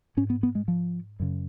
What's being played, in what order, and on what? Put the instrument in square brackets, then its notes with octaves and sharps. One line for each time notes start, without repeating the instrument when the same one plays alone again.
[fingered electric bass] G#2 C#4
B3
B3
G#3
F3
F#2 C#3